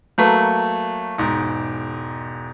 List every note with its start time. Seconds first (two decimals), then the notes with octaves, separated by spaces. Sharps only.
0.18 F#3 A3 A#3 B4
1.18 E1 G#2